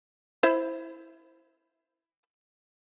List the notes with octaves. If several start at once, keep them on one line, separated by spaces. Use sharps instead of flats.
E4 C5 E5